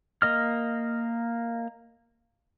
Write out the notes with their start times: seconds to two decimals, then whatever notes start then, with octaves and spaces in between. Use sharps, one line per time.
0.22 A#3 D#5 F6